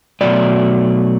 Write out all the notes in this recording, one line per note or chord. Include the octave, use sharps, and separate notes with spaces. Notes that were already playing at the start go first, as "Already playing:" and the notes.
B2 F#3 A3 D5